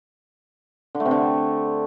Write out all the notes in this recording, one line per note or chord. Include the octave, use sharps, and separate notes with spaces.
D3
A3
C3
D3